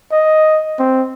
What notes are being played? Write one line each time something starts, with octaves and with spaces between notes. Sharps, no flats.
D#5
C4